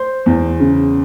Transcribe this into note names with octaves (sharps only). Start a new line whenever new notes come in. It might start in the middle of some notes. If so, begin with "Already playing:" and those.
Already playing: C5 C6
E2
C#3